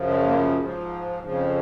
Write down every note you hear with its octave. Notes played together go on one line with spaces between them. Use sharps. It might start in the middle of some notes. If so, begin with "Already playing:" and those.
Already playing: F#2 C#3 F3
G#3
A#3
G#2 F3
F2 C#3 F3